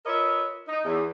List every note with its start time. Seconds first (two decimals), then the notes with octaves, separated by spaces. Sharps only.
0.06 F4 A#4 B4 C#5 D#5 E5
0.68 D#4
0.85 E2